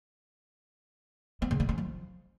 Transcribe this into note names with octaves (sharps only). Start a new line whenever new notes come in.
B3
C#3
D4
C#4
F3